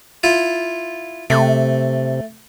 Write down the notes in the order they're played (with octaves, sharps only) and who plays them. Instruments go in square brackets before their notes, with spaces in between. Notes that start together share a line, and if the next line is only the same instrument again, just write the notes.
[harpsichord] E4 F4
[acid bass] C3 [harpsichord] A3